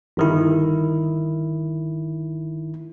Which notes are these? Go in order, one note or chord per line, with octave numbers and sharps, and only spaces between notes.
G1 D#3 E4